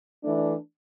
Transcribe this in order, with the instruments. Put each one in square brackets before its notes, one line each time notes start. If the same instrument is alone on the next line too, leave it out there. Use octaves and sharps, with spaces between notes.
[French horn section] E3 A3 D4